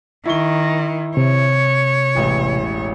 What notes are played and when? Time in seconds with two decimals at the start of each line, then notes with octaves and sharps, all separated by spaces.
0.26 D#3 E4 C#6 G7
1.17 C3 C#5
2.15 E1 A1 E4